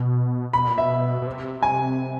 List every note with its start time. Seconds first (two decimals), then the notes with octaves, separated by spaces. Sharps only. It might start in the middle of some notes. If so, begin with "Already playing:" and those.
Already playing: B2
0.53 B2 B5
0.67 A#2
0.78 B2 E5
1.22 B2
1.27 C3
1.63 G#5